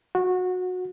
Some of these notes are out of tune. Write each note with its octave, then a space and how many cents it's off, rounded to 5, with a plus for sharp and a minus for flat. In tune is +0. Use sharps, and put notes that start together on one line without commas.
F#4 -20